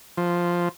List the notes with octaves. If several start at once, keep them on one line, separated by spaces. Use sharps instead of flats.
F3